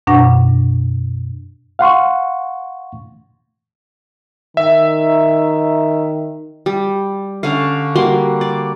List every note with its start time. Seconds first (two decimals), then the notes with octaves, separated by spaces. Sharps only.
0.07 F#2 B2 D4 F#5 C#6 A#6
1.79 F5 F#5 C6 C#6
4.57 D#3 E5
6.66 G3
7.43 D3 C#4 F5
7.96 G3 A#3 F#4 C6
8.41 D5